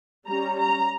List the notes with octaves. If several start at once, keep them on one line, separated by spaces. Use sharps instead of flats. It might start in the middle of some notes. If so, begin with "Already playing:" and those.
G3 C#4 A#5
A#5